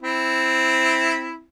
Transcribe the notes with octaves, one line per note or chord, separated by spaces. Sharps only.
C4 E4